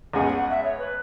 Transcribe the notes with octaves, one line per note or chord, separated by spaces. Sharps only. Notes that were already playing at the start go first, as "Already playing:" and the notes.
C#2 B2 G#3 C#4 G#4 F#5
F#5
F#5
E5
C#5
B4